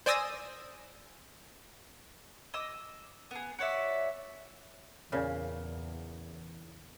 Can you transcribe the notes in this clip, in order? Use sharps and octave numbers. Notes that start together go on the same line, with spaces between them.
C5 D5 G#5 D#6 E6 A#6
D#5 D6 E6
B3 G#4
F#4 C#5 D5 E5
E2 A#2 C#3